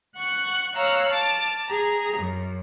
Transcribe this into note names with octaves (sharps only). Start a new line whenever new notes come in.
F#5 C#6 F#6
C#5 F5 A#5 E6 F#6
A5 D6 F6
G#4 A#5
F#2